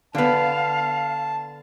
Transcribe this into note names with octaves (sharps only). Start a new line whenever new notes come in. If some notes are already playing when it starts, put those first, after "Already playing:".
D3 B3 F5 A5